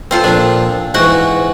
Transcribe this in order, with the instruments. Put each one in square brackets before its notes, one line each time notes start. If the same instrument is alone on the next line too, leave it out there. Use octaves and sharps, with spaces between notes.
[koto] C4 F4 A4
[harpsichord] A#2 F3 [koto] D4
[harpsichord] G#2 E3 [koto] F#4 F#5